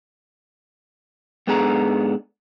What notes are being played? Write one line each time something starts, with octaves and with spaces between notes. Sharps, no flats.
G#2 B3 D4 G#4 A4 A#5